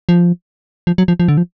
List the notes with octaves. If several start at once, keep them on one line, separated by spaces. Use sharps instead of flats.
F3
F3
F#3
F3
F3
D3
F3